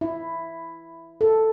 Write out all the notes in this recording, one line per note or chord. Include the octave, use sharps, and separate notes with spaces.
E4
A4